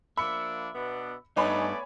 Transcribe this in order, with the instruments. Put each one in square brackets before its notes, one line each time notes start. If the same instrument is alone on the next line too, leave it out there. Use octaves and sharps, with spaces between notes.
[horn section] F3 A#3 D4 [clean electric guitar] E5 [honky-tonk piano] B5 C#7
[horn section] B2 B3 D4
[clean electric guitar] G2 [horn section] A3 B3 D5 [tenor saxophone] D#4 [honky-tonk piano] C#5 G#5 B5